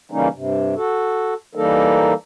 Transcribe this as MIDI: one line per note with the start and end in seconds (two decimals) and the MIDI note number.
0.11 0.28 49
0.11 0.28 52
0.11 0.28 55
0.11 0.28 58
0.11 0.28 61
0.11 0.28 63
0.34 0.75 43
0.34 0.75 48
0.75 1.34 66
0.75 1.34 69
1.55 2.14 52
1.55 2.14 55
1.55 2.14 58
1.55 2.14 63
1.55 2.14 69
1.55 2.14 70